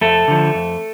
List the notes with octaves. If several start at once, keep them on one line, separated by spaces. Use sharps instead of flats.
F2 A3 A4
D3 F3
F2